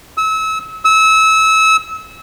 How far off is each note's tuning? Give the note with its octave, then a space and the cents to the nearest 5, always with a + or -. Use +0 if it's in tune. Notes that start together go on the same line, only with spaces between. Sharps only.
E6 -30
E6 -25